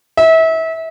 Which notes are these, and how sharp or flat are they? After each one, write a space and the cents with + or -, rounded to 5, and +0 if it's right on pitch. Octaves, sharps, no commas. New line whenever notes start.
E5 -30